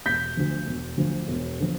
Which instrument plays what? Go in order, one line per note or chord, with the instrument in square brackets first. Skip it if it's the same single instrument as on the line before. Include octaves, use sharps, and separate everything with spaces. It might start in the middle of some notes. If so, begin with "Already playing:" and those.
[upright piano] E1 G6 B6
D2 D3 F3
E1
D2 D3 F3
E1
D3 F3